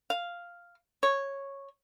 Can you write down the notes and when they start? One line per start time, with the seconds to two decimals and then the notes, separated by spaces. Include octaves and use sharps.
0.10 F5
1.03 C#5